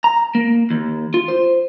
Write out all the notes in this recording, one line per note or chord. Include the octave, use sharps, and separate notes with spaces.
A#5
A#3
D#2
F4
C5